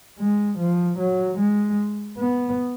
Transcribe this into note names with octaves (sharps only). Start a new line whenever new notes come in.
G#3
F3
F#3
G#3
B3